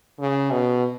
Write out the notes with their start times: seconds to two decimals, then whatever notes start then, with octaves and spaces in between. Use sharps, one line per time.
0.19 C#3
0.51 B2